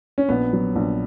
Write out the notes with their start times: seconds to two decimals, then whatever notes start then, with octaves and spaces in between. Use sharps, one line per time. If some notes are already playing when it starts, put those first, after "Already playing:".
0.18 C#4
0.29 A#1 B3
0.53 F#3
0.76 A#1